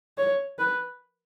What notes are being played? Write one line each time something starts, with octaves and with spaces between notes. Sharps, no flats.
C#5
B4